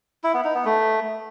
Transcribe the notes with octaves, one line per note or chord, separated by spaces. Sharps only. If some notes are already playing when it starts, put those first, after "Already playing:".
E4
B3
D#4
B3
A3